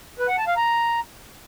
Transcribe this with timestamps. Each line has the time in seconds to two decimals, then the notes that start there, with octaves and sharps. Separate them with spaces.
0.19 B4
0.28 F#5
0.38 A5
0.47 F5
0.57 A#5